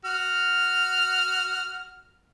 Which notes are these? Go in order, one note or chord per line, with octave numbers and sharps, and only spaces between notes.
F#4 F6